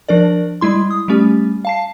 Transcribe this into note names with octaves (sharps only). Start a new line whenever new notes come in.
F3 D4 A#4 D5
G3 G#3 E4 C6
D#6
G3 A3 C#4 G4
F5 A5 C7